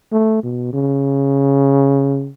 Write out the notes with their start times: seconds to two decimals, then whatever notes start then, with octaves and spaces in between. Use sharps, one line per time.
0.12 A3
0.43 B2
0.73 C#3